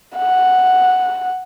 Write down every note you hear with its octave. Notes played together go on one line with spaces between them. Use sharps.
F#5